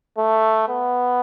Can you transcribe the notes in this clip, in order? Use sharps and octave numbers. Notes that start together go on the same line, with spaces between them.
A3
B3